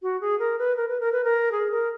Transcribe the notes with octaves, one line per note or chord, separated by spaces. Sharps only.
F#4
G#4
A#4
B4
A#4
B4
A#4
B4
A#4
G#4
A#4